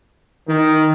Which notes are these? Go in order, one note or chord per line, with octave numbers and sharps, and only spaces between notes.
D#3